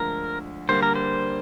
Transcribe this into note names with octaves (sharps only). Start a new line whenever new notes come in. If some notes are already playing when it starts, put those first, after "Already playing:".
Already playing: D2 D3 F3 G#3 A#4
D3 G3 A#3 C5
A#4
C5